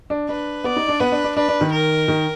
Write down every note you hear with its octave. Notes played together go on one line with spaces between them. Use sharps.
D4
D4 B4
B3 D5
D#4
D4
B3 B4
D4
D4
D4 B4
D4
D#3
A#4
D#3